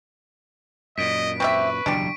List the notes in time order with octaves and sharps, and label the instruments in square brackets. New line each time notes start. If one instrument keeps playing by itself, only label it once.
[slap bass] F#2 A#2 [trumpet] D#5 [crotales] B6 D7
[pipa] C4 G4 E5 [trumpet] B4 [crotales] C#6 B6
[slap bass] F#1 E2 B2 [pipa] D4 G4 [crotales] D7